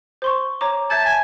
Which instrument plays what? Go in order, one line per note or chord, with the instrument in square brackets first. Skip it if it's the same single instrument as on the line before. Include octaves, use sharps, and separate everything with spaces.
[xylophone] C5 C6 C#6
C#5 A#5 D6
[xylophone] E5 G6 G#6 [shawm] A5
[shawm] G#5